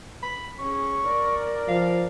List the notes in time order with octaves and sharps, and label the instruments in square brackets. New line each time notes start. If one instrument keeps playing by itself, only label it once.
[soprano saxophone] B5
[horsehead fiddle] C#4 G#4 [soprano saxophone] C#6
[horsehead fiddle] A#4 D5
[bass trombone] F3 [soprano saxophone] F5